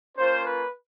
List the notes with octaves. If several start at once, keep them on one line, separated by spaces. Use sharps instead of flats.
A#3 C#4 F4 C5
B4